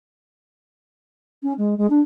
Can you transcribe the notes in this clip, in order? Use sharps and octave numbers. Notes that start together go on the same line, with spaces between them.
C#4
G#3
G#3
D4